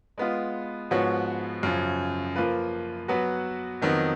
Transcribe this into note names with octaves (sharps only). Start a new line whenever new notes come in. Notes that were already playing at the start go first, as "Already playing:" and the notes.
G#3 B3 F4
G#2 F3 B3 F#4 C#5
F#2 C#3 F3
F3 A#3 F4 B4
F#3 B3 F#4 B4
F2 D#3 F#3 B3 D#4